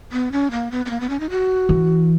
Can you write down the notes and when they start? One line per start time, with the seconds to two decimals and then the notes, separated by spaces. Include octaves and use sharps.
0.12 B3
0.32 C#4
0.51 A#3
0.71 B3
0.86 B3
0.90 A#3
1.00 B3
1.10 C#4
1.20 D#4
1.30 F#4
1.69 E3